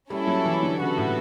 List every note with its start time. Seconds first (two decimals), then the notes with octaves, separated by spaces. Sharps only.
0.10 G3 C#4 E4 A4
0.27 F#3
0.45 E3
0.63 D3
0.80 C#3 B3 F#4 A4
0.97 A2